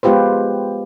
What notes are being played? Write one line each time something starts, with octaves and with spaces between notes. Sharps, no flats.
G#3 B3 F4 G4 B4 C5